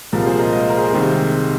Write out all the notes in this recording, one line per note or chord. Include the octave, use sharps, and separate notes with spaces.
C2 A#2 F3 G#3 A#4
G#4 C5
A#4 D#5
D#5
C5
A#4
G#4 C5
C2 C3 D#3 G#3